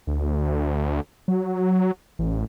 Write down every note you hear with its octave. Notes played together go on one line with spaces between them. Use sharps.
D2
F#3
A1